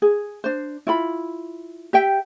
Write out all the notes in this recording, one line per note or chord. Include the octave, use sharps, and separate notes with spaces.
G#4
D4 C5
E4 F4 B5
G4 E5 G5